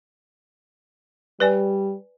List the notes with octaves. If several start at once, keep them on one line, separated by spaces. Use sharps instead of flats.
G3 B4 D5 G#5